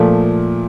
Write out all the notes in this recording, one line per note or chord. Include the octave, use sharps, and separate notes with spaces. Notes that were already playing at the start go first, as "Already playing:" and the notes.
Already playing: A#2 F3 A3